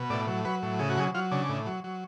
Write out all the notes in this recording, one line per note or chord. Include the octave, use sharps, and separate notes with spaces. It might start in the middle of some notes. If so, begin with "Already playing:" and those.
Already playing: B2
A2 D5
F#3
F#3 B4
A2
C#3 G#4
F#4
F#3 G#4
F#3 F4
C#3 D4
A2
F#3
F#3